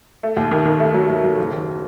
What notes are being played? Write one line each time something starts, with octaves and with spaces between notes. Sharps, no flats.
A3
D#2
D#3
D#3
A3
F#3
F#3
F#3
F#1
D#3